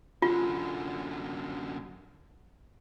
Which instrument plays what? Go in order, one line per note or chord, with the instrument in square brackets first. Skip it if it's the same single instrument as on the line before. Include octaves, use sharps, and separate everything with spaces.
[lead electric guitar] F#2 D3 [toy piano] F4